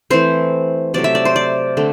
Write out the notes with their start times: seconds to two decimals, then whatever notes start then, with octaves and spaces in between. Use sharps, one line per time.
0.10 E3 A3 C4 C5
0.94 C3 F#3 A3 D5
1.04 E5
1.15 D5
1.25 C5
1.36 D5
1.77 D3 A3 C4